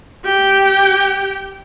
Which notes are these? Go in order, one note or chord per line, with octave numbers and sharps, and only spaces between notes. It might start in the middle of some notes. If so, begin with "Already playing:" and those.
G4 G5